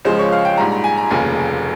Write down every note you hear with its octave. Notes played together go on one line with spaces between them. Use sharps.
C#2 C#3 F3 G#3 C5
C#5
F5
G5
A#1 G#2 G3 A#5
A#5
G#5
A#5
F1 D#2 C#3 G#5